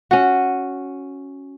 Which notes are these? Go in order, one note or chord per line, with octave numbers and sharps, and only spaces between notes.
C#4 F#4